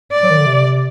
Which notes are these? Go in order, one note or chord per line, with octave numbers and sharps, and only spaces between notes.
D5
F#3
D#3
D3
C3